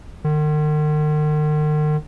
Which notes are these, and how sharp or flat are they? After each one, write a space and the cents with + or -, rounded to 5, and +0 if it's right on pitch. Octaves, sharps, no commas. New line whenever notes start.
D#3 -45